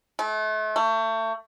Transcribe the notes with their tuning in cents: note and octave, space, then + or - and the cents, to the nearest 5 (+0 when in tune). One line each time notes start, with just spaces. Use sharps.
A3 -35
A3 +30